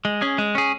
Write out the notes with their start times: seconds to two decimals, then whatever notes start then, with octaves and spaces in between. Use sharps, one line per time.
0.05 G#3
0.22 C#4 G#4
0.38 G#3
0.55 C#4 G#4